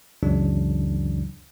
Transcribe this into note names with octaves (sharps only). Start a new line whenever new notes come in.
C#2 F#2 C#3 E3 F#3 D4